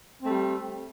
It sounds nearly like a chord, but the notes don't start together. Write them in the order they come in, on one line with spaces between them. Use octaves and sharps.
C4 A3 G3